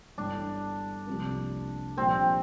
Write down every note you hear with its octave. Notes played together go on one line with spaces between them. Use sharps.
G1 G2 E3 D4
C2 C3 F3 A#3
A#1 A#2 G3 A#3 C4